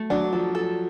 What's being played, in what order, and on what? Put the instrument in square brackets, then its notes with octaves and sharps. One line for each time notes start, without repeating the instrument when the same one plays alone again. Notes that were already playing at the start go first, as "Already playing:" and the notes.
Already playing: [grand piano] F#3 [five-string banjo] A3
[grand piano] F#3 [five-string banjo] D4
[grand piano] F3 [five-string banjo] A4
[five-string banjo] A4